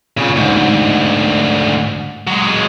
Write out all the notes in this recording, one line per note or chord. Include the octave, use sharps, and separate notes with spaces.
A#2 C#3
D2 G#2
F#3 G#3